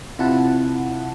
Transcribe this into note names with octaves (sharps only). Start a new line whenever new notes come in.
C3 E4 F4 F#5 A5